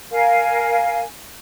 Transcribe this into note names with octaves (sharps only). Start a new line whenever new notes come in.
A#4 F5 G#5